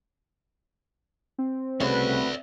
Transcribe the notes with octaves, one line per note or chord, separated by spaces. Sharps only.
C4
C2 C#3 A3 F#4 B4 C#5 D5 E5